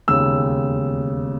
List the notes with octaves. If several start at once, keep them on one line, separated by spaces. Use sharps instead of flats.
E1 D#2 C#3 E6